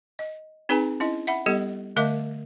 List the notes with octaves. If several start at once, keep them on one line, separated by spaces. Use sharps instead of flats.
D#5
C4 D#4 G#4 B4 G#5 A#5
C#4 E4 D#5
E5 F#5 B5
G3 B3 G4 A4 D#5
D3 A3 A#4 D#5 E5 D6